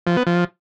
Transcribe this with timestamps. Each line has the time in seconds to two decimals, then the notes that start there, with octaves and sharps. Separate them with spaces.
0.07 F3
0.17 B3
0.27 F3